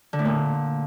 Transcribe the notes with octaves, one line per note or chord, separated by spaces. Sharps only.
D3
A2
A#2